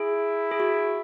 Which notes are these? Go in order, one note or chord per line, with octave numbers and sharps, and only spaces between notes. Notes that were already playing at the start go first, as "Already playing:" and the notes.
Already playing: E4 G#4
G#4
F#4